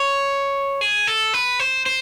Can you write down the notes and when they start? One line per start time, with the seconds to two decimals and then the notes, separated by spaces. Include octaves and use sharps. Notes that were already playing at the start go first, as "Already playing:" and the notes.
Already playing: C#5
0.81 G#4
1.07 A4
1.34 B4
1.60 C5
1.86 C5